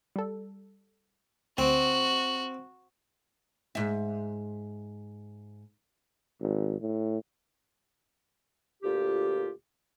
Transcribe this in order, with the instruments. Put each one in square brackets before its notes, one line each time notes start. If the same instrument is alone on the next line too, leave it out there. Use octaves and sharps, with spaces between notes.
[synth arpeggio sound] G3 A4
[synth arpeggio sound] D2 [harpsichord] C4 [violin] F#4
[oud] G#2 E5
[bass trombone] G#1
A2
[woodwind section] D2 A#2 F4 G4